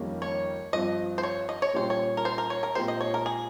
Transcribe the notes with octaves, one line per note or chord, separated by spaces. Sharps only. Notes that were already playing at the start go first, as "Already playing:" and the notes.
Already playing: F2 D#3 G3 A#3 C#4
C#5
G2 F3 C4 D#5
C5
C#5
D#5
C#5
A#2 G3 C#4 G4 C5
C#5
A#4
C5
A#4
C#5
A#4
A#2 G#3 C4 G4 C5
D#5
C#5
A#4
G#4